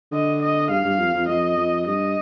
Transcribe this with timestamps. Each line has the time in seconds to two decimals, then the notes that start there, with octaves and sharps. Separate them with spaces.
0.12 D3 D#5
0.42 D#5
0.70 G2 F5
0.85 G2
0.99 F2
1.14 F2
1.29 F2 D#5
1.57 F2
1.87 G2 D#5